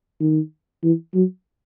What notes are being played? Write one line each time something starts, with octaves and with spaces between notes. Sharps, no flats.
D#3
E3
F#3